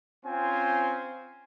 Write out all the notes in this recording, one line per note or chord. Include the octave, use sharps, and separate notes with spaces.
C4 C#4 F4 C5 G#5